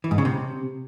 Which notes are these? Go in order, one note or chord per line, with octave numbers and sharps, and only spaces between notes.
E3
G#2
C#3
C3